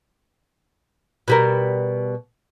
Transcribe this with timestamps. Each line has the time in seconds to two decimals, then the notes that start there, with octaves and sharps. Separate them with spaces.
1.28 B2 G3 A#4